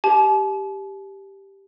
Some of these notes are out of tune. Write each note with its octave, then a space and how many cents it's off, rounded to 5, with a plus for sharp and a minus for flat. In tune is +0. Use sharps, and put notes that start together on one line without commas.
G4 +0 A5 -45